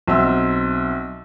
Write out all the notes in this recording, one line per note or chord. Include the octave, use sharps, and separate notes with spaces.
B1 C4 E5 E6